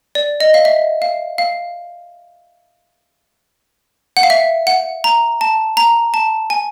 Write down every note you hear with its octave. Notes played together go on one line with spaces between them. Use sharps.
D5
D#5
F5
E5
F5
F5
F#5
F5
E5
F#5
A#5
A5
A#5
A5
G#5